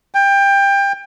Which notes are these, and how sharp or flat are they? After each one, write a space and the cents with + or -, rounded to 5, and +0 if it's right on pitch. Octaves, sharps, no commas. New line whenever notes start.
G5 +20